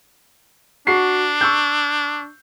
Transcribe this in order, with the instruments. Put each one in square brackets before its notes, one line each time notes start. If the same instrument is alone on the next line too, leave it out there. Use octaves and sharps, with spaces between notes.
[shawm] D4 [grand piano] F#4 C#6 C7
[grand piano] C#6 E6 G6